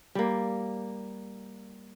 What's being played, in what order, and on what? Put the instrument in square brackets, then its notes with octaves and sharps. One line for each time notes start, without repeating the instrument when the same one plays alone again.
[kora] G3 A#3